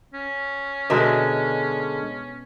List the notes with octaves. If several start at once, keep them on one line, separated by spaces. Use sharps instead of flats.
C#4
B2 D3 G#3 A#4 E5